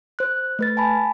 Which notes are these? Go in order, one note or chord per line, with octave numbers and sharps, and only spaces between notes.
C5 F#6
A3 B4 A6
G#5 A5 B5